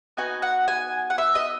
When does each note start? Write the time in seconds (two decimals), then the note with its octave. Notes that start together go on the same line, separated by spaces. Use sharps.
0.17 B3 D#4 F#4 G#5
0.42 F#5
0.68 G#5
1.10 F#5
1.18 E5
1.35 D#5